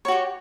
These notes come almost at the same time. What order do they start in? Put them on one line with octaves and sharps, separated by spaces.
C#5 F#4 G4